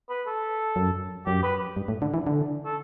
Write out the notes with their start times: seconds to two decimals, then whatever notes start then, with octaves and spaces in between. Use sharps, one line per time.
0.10 B4
0.27 A4
0.76 F#2
1.26 F#2 G4
1.43 B4
1.77 G2
1.88 A2
2.02 D3
2.14 E3
2.27 D3
2.65 A4